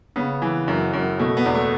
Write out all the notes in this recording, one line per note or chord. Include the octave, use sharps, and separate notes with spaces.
C#3 B3
E3
F#2
F#2
B2 A3
B3
E2
A3